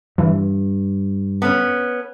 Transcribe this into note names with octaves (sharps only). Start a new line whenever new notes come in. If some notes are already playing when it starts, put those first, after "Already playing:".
G2 E3
B3 C#4